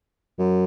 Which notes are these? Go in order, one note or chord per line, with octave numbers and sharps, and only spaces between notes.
F#2